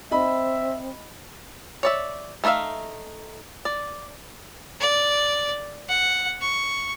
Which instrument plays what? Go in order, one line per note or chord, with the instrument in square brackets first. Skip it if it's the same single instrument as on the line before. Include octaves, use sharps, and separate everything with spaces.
[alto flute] C4 [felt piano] D#5 B5 [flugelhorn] E5
[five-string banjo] C#5 D5 E5
A3 D#4 F4 E5 F5
D5
[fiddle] D5
F#5
C#6